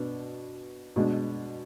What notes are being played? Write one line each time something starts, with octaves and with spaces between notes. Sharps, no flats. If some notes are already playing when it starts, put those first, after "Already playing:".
Already playing: B2 B3 D4
B2 G#3 D4